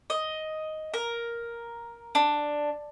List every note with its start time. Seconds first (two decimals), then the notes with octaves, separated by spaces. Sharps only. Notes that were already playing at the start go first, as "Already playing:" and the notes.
0.10 D#5
0.94 A#4
2.15 D4